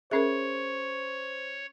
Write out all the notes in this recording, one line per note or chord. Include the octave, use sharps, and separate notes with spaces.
C#4 G#4 A#4 C5 C#5 E5